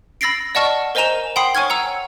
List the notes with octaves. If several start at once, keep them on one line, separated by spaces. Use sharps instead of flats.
B5 E6 A6 A#6 C7 D7
D5 D#5 F#5 A5 C#6 F6
A#4 C5 D#5 G#5 A#5 E7
F#5 G5 B5 C6 D#6 C7
C#5 G#5 C#6 F6 G#6
F#5 A#5 E6